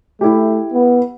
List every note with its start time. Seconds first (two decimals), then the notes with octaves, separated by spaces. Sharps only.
0.21 A3 E4 G4
0.73 B3